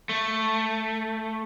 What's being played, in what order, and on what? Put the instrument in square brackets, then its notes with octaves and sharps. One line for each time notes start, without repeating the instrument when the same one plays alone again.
[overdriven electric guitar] A3